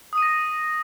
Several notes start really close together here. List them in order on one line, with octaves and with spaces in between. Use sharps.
D#6 D#7 A#6